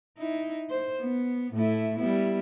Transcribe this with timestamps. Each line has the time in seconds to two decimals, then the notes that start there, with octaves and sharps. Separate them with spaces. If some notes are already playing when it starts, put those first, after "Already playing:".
0.17 D#4 E4
0.70 C5
1.01 B3
1.53 A2 A3 E4
1.97 G3 B3 E4